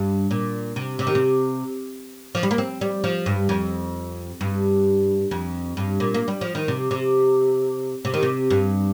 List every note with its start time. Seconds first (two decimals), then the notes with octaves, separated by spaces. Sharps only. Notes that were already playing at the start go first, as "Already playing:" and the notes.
Already playing: G2
0.31 A#2
0.76 C3
0.99 C3
1.07 D#3
1.15 C3
2.35 F3
2.43 G3
2.51 A#3
2.58 C4
2.81 G3
3.04 F3
3.26 G2
3.49 F2
4.41 G2
5.31 F2
5.77 G2
6.00 A#2
6.14 A#3
6.28 G3
6.41 F3
6.55 D#3
6.68 C3
6.91 C3
8.05 C3
8.14 D#3
8.23 C3
8.50 G2